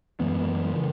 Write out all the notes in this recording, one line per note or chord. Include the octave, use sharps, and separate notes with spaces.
F#2 E3 G#3 B3
C#3 E3